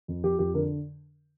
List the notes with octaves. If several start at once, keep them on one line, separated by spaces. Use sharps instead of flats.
F2
F3 G4
F2 G4
D3 A#4